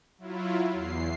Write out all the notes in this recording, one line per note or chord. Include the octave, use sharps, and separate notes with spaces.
F#3 E4 F4
E2 C7